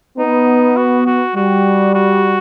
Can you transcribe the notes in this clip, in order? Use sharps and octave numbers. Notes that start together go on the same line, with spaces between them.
B3 D#4
F#4
F#4
G3 F#4
F#4